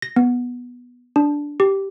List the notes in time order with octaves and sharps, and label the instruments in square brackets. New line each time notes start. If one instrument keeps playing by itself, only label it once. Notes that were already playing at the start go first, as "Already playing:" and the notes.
[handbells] A#6
B3
D4
G4